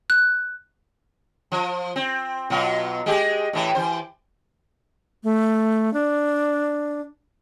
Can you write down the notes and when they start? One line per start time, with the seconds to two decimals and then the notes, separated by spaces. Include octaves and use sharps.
0.10 F#6
1.52 F3
1.96 C4
2.50 B2 F#3 F4
3.06 G#3 G4 G#4
3.53 A2 E3 E4
3.75 E3 C5
5.24 A3
5.93 D4